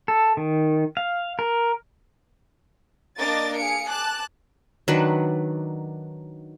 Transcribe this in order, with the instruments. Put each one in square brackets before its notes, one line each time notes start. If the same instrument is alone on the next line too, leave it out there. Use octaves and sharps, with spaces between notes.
[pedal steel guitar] A4
D#3
F5
A#4
[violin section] A#3 D4 A#4 D#5 D6 A6
G#4 F5 C#7 D7
A5 D6 F#6
[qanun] D#3 F#3 D4 B4